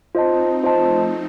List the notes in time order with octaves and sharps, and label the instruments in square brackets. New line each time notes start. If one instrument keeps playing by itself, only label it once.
[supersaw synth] C4 D#4 [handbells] F4 C5 D#5 A5
[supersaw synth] F3 A3 [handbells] F4 C5 D#5 A5